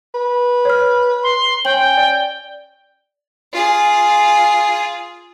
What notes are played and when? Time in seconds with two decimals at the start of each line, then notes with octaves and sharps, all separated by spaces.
0.14 B4
0.65 C#5 F6
1.23 C6
1.65 C#4 G5 F#7
1.97 D5
3.53 F4 G#4